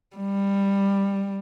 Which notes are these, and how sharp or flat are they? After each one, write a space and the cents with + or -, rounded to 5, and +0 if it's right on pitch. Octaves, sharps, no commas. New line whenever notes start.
G3 +15